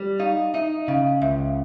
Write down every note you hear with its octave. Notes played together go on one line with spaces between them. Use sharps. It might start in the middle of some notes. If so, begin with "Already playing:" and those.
Already playing: G3
D#4 F5
D#4 E5
C#3 F5
C#2 E5